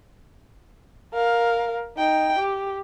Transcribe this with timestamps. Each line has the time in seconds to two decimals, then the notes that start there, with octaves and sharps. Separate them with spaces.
1.14 A#4 F5
1.97 D#4 G5
2.39 G4